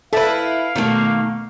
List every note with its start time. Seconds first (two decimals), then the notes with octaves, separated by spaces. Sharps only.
0.13 E4 A4 B4 F5 A5
0.76 B2 D#3 A3 A#3